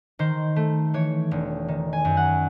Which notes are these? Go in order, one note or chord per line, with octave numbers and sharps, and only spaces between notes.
D#3 C5
A3
E3 C#5
E1
D#3
G#5
F#2
F#5